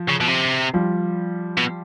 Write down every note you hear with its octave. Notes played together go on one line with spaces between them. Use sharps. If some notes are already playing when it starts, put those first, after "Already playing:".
Already playing: F3
C#3
B2
C3
F3 G3
B2